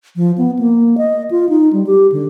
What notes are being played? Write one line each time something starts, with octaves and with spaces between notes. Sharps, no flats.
F3
B3
A#3
D#5
F4
D#4
G3
G4
D3